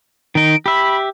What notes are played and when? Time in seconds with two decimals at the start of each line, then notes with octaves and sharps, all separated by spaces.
0.35 D#3 D#4 D7
0.66 G4 E5 B5